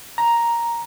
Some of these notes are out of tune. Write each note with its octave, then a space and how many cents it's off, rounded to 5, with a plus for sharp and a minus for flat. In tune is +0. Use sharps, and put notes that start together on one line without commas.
A#5 +5